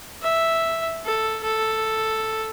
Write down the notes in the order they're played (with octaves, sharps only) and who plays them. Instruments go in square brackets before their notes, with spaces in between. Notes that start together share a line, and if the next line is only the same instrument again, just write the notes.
[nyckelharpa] E5
A4
A4